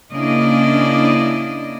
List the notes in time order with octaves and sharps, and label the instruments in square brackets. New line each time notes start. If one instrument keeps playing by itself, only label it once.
[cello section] C#3 A#3 D4 E4 D5 D#5